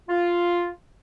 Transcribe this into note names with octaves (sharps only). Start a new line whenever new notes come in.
F4